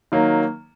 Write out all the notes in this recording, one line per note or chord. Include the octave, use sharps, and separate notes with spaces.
D#3 F#3 A#3